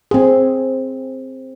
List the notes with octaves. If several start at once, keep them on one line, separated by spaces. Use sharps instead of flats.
C4 G#4